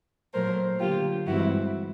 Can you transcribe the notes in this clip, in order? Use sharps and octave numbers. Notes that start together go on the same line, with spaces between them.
A#2 F#3 A3 A#4 C5
D3 F#3 A#3 F4 G4
G2 E3 G#3 C4 E4 F#4